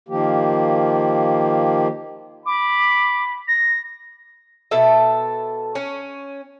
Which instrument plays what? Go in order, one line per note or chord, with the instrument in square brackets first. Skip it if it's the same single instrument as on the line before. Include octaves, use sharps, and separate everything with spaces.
[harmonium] D#3 F3 A#3 G4
[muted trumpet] B5 [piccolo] D6
[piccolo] A#6
[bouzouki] B2 A4 E5
C#4